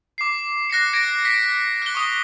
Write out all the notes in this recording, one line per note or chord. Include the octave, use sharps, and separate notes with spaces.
D6 C7
F#6 A#6 C7 C#7
G#6 A#6 D7
B6 D7
F#6 G7
C#6 D#6 G7